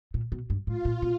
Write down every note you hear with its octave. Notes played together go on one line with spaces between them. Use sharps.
A#2
B2
G2
A2 F4
A#2
B2